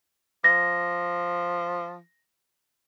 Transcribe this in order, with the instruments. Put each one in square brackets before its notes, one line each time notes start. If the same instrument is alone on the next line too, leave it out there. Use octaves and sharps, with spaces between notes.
[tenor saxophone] F3 [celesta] A#6